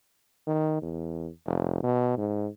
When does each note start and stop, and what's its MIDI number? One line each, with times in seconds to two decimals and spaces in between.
0.47 0.79 51
0.82 1.29 40
1.46 1.83 29
1.83 2.17 47
2.17 2.47 44